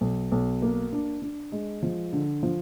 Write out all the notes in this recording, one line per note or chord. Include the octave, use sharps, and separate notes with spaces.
B1
B1
A#3
D4
D4
G#3
F3
D3
F3